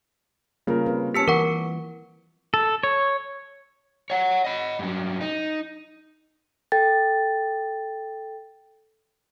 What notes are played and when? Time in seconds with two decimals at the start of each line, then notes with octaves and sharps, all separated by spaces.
0.67 C#3 G3 A#3 F4 A#4
0.86 C4 B4
1.14 C#4 G4 A5 E6 B6 C#7
1.28 E3 A#4 F#5 C#6 D6
2.54 A4
2.83 C#5
4.10 C#5 F#5
4.44 D#5 B5
4.79 G2 F#3
5.21 D#4
6.72 A4 G5 A6